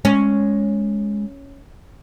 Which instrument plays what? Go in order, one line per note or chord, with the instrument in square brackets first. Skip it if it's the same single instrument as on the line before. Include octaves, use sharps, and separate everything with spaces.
[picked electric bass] G#3 [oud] C#4